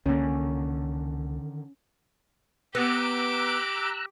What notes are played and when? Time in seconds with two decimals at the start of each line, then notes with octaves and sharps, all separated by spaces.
0.06 C#2 D3 D#3 A#3 C#4
2.75 B3 G4 A#5 D6 E6 F#6